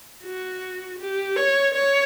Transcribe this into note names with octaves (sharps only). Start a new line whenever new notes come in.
F#4
G4
C#5
C#5